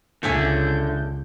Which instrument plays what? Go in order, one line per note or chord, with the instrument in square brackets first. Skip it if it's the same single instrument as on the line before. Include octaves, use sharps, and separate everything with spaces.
[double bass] C#2 [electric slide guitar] D3 [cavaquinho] C#5 E5 G#5 [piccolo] G6